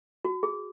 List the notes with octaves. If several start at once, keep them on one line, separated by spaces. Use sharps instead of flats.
F#4
G#4